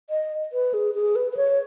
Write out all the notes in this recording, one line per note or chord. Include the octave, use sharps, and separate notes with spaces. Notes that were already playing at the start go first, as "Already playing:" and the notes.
D#5
B4
G#4
G#4
B4
B4
C#5